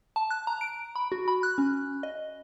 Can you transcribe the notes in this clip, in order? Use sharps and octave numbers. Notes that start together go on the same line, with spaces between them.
A5
F#6
A#5
D7
B5
F#4
B5
F#6
C#4
D#5